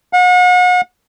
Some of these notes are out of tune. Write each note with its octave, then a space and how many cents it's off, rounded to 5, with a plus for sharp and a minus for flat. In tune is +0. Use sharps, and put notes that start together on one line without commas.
F#5 -40